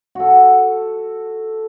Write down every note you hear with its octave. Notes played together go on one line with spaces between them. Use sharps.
F#4 A4